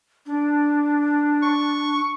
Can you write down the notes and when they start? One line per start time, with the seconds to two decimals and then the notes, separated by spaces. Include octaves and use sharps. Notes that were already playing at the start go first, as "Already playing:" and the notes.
0.26 D4
1.42 C#6